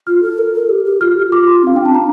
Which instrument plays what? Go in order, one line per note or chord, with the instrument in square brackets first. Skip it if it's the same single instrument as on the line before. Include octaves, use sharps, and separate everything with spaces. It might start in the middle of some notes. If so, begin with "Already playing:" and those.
[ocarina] F4 [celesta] F6
[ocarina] A4
A#4
A4
G4
G4
[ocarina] F4 [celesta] F6
[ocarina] G4
[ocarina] F4 [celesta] D6
[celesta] C6
[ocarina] C4 [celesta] F5
[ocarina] D4 [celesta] G5
[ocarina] C4 [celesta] A5
[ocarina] D4 [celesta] A#5